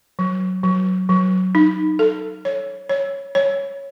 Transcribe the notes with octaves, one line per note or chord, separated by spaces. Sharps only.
F#3
F#3
F#3
D#4
A4
C#5
C#5
C#5